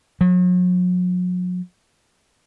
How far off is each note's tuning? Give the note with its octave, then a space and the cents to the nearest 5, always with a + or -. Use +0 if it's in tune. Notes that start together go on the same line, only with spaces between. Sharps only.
F#3 -40